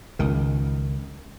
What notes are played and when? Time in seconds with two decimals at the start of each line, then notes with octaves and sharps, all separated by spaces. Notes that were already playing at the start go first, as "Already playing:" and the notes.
0.19 C#2 D#3